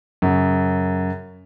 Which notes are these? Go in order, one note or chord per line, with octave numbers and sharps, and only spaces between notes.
F#2 C#3